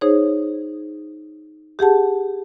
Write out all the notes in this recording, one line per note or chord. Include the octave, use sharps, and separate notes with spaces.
D#4 G#4 C5 C#5
G4 G#4 F#5 A5